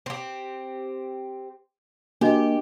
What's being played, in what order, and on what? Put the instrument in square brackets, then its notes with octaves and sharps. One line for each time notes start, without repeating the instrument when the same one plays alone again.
[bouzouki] C4 G4
[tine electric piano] A#3 [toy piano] D4 F#4 D#5 [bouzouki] G4